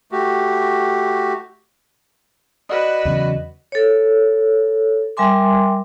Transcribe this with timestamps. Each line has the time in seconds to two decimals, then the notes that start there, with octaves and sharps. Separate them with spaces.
0.12 A3 F#4 G4
2.69 F#4 B4 D5 D#5 D#6
3.05 E2 C#3 F#3
3.72 A4 C#5
5.17 G3 A#4 E5 G#5 C6 D6